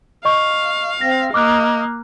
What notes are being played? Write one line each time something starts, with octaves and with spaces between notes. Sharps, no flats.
D#5 F5 C#6
C4 A#6
A#3 D#5 D6 F6 F#6